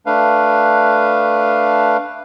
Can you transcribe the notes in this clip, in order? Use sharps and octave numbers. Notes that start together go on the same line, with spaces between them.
A3 D4 B4 F5